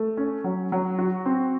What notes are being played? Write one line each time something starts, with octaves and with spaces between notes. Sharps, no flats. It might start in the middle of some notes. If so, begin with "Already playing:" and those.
Already playing: A3
C#4
F#3
F#3
F#4
C4